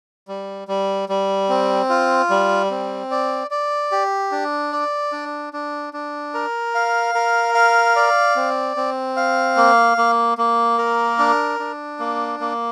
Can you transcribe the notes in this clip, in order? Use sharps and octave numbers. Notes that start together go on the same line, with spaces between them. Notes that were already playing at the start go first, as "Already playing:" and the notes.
G3
G3
G3
C4
F4
G3
C4
D5
D5
G4
D4
D5
D4
D4
D4
A#4
F5
A#4
F5
D5
C4
C4
F5
A#3
A#3
A#3
A#4
D4
D4
A#3
A#3